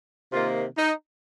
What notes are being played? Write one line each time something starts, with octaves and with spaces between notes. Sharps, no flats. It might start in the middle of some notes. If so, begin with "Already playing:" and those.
C3 D#3 A#3 F4
D#4